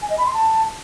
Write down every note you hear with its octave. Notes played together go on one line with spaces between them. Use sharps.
G#5
D#5
B5
C6
A5